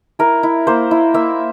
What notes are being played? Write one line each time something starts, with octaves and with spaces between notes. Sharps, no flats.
E4 A#4
E4
A#3 C5
E4
A#3 E5